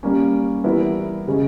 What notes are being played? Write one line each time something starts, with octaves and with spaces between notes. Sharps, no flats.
G3 A#3 C#4
E3 G3 B3 E4 A#4
C#3 G#3 C#4